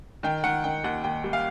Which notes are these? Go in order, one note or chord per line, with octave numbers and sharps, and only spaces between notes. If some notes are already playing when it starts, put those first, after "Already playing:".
D#3 G5
D#3 F#5
D#3 G5
D#2 F#5
D#2 G5
G3
F5